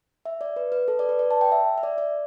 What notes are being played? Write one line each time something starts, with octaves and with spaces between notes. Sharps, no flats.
E5
D5
B4
B4
A4
D5
B4
D5
A5
G5
E5
E5
D5
D5